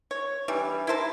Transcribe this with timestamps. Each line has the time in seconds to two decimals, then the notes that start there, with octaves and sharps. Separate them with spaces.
0.11 C#5
0.48 E3 G3 D4
0.87 E4 A#4 C5 A5